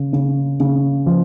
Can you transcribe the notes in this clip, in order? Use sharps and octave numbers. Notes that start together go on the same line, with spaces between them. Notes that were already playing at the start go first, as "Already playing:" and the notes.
Already playing: C#3
C#3
C#3
F3